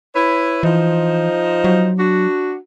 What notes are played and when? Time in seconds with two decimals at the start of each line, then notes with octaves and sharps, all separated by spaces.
0.15 E4 B4 C#5
0.63 E3 F3 D#4 C5
1.64 F#3
1.99 D4 F#4